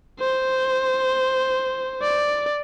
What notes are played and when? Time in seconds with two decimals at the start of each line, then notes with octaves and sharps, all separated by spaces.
0.20 C5
2.02 D5